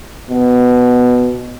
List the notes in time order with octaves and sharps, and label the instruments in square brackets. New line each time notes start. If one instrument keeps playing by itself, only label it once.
[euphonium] B2